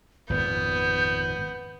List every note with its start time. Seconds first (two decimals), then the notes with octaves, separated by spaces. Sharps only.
0.30 G#1 F2 A#2 B3 G6